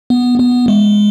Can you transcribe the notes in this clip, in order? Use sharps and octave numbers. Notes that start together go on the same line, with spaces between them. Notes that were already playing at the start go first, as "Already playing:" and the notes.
B3
B3
G#3